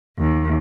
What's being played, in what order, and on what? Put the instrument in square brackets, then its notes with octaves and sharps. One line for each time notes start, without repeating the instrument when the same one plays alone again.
[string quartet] D#2